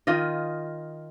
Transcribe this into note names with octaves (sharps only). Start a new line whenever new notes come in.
D#3 F4 D#5